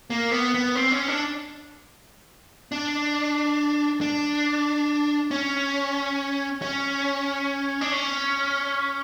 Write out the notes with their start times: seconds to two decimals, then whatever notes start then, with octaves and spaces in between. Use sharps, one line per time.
0.10 A#3
0.32 B3
0.54 B3
0.76 C4
0.91 C#4
1.08 D4
2.72 D4
4.01 D4
5.31 C#4
6.62 C#4
7.81 D4
7.92 C#4